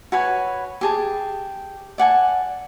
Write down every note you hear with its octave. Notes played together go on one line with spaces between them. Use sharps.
F#4 B4 C#5 G#5
G4 G#4 A5
D5 F#5 G#5 A5